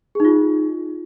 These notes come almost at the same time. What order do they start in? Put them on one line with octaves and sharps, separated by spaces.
G#4 D#4 F4